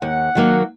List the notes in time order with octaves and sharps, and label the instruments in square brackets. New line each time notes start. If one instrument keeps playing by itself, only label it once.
[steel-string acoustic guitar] D#2 [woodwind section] F#5
[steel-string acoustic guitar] D#3 F#3 A#3